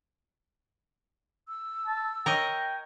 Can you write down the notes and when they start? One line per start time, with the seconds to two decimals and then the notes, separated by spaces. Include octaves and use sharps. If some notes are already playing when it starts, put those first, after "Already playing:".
1.48 E6
1.87 A5
2.26 A#4 C#5 D#5 G5